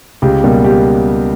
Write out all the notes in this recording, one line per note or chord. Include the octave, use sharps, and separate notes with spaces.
C#2 G4
B2 G3 A#3
G4